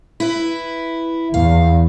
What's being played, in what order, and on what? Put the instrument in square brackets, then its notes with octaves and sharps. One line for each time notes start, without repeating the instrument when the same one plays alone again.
[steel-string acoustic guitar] E4 B4
[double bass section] E2 [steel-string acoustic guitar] F5